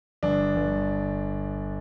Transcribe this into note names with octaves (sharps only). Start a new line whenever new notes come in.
G1 D4
G1